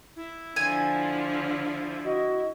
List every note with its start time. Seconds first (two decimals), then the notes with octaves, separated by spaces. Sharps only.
0.16 E4
0.56 D3 F3 G#5
2.05 F#4 D#5